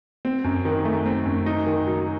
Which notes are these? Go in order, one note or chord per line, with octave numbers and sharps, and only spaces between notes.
C4
F#2
D#3
A3
C4
F#2
D#4
D#3
F#3